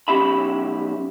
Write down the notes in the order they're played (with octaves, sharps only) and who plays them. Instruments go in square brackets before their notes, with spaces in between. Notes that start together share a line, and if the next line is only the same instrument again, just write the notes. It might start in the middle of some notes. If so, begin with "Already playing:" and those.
[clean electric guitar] B1 E3 C#4 G4 E5 B5